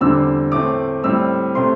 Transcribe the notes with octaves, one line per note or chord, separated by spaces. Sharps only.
E2 D3 G3 C4 E6
A2 A3 C4 D6
A2 G3 C4 E6
C3 A3 C4 C6